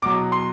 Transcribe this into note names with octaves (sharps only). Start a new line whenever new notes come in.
E2 B2 F#3 D6
C6